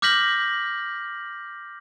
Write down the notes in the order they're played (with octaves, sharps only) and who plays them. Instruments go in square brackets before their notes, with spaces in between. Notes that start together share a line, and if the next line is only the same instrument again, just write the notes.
[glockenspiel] D6 F6 G6 A#6 B6 F#7